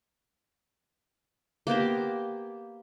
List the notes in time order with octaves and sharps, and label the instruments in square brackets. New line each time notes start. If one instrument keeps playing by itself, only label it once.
[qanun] A#3 B3 G4 C5